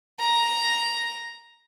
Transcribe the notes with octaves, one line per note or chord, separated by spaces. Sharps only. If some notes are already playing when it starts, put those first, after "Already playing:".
A#5